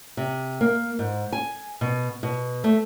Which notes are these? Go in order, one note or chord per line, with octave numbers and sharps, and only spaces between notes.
C3
A#3
G#2
G#5
B2
B2
A3